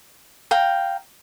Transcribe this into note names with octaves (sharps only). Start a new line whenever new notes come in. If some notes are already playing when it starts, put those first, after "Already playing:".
F5 G5 A#5